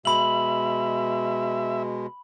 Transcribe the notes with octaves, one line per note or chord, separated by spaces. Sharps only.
B2 G#3 E5 B5 F#7